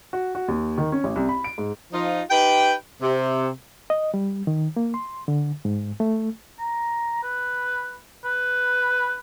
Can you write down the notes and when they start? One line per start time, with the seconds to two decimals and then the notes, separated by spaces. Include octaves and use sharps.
0.13 F#4
0.35 F#4
0.48 D#2
0.78 D#3
0.92 C#4
1.04 A1
1.16 C2
1.29 B5
1.44 D7
1.58 G#2
1.92 F3 D#4 F4
2.30 D#4 G4 B4 G5
3.01 C3
3.90 D#5
4.14 G3
4.47 D#3
4.76 A#3
4.94 C6
5.28 D3
5.65 G#2
6.00 A3
6.59 A#5
7.23 B4
8.25 B4